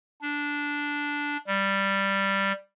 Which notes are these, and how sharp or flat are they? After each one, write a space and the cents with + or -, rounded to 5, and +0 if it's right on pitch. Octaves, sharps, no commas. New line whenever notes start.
D4 -10
G3 +0